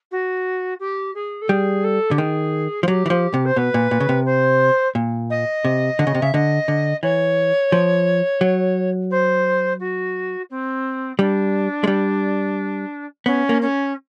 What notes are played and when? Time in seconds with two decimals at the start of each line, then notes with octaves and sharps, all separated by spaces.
0.11 F#4
0.79 G4
1.14 G#4
1.41 A4
1.49 G3 G#4
1.84 A4
2.11 D3 G4
2.18 D#3 G#4
2.83 F3
2.87 F#3 G4
3.06 E3
3.10 F3
3.34 C3
3.45 C5
3.56 B2 B4
3.74 A#2
3.91 A#2
4.00 C#3
4.09 C3
4.25 C5
4.95 A#2
5.30 D#5
5.65 C3
5.99 D3
6.07 C#3
6.15 C3
6.21 C#3 E5
6.34 D3 D#5
6.68 D3
7.03 E3 C#5
7.72 F3
8.41 F#3
9.10 C5
9.79 F#4
10.50 C4
11.18 G3 D4
11.84 G#3
11.87 G3
13.26 B3 C#4
13.49 A#3
13.61 C#4